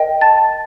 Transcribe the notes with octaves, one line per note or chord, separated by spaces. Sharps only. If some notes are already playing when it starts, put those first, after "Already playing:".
Already playing: A#4 D#5 G5
A5 A6